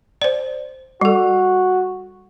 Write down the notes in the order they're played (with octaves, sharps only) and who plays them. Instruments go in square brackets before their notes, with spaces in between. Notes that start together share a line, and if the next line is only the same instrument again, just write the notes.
[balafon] C5 D5
[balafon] G3 A4 [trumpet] F#4